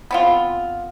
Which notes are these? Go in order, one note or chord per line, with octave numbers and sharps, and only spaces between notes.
B3 C4 F4